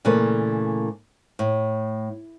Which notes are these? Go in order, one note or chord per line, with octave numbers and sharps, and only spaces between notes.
A#2 C#3 E3 A3 B4
A2